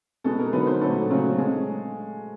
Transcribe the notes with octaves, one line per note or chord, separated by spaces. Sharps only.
B2 G#3 B3 A4
A#4
D3 F#3 B3 D#4 B4
C5
A#2 F#3 A3 A4
C#3 F#3 A3 C4
G#3